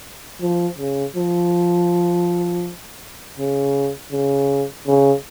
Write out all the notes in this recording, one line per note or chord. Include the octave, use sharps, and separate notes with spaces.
F3
C#3
F3
C#3
C#3
C#3